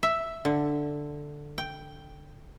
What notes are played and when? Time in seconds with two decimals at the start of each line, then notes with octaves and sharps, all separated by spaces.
0.03 E5
0.45 D3
1.58 G5